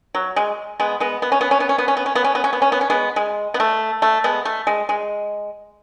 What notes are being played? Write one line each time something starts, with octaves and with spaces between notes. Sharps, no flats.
F#3
G#3
G#3 B3
G#3 B3
B3
C#4
B3
C#4
B3
C#4
B3
C#4
B3
C#4
B3
C#4
B3
C#4
B3
C#4
B3
C#4
G#3 B3
G#3
B3
A3
A3
G#3 B3
A3
G#3
G#3